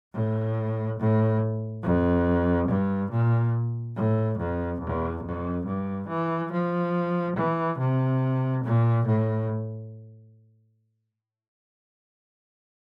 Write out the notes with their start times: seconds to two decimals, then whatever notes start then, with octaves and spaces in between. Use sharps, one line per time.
0.13 A2
0.99 A2
1.83 F2
2.68 G2
3.11 A#2
3.96 A2
4.38 F2
4.81 E2
5.24 F2
5.65 G2
6.08 E3
6.51 F3
7.36 E3
7.78 C3
8.64 A#2
9.06 A2